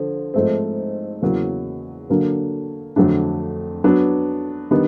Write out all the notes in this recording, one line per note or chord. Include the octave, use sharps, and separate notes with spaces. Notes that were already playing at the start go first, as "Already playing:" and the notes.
Already playing: D3 F3
G#2 F3 A3 C4
E2 C#3 F#3 A#3
D3 F#3 A#3 D4
F2 D3 F#3 A3 D4
F#3 B3 D4
D#3 G3 B3 D4